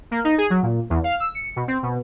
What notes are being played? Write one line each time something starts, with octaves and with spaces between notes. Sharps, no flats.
A#3
D#4
G#4
F#3
A#2
E2
F5
E6
C#7
B2
C4
B2